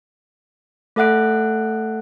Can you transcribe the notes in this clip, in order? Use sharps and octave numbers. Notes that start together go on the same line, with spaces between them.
A3 A4 E5 F#5 F#6 D7